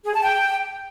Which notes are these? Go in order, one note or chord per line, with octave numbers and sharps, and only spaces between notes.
G#4
A5
G5